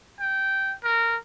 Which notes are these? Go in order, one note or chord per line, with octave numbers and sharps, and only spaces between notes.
G5
A#4